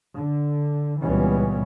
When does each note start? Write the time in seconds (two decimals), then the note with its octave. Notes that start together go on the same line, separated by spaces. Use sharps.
0.15 D3
1.01 C#2 A#2 E3 G3 B3 C#4